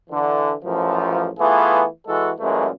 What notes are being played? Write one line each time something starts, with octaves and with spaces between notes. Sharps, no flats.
D3 E3
A1 F#2 F3
E3 A3 B3 F4 G#4
E3 G#3 F#4 A4
F#2 A#2 E3 G#3 A3